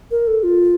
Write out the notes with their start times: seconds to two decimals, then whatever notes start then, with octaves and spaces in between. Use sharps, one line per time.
0.11 A#4
0.27 A4
0.43 F4